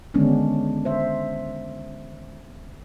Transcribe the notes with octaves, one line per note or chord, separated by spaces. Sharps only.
D3 D#3 G#3 B3 C#4 D4
C5 E5